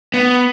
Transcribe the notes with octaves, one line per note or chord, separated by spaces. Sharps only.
B3